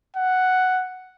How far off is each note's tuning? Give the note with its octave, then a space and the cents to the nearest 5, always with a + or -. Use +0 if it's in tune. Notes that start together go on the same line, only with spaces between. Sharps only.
F#5 +5